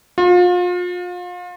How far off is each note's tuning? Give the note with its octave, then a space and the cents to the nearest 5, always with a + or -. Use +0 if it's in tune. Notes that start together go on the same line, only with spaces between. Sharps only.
F4 +35